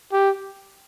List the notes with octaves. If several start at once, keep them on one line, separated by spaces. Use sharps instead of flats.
G4